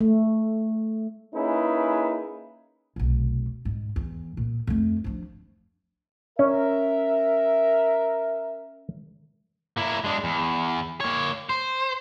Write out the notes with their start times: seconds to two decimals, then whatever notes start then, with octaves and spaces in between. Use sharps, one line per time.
0.01 A3
1.34 A#3 C#4 D#4 E4 G#4 B4
2.96 F1 B1
3.65 G#2
3.96 E2
4.37 A#2
4.67 F2 A3
5.04 F3 D4
6.39 C#4 A#4 E5
9.77 A#3 E4
10.04 G#3 D4
10.24 E2
11.00 A#3 C#5
11.49 C5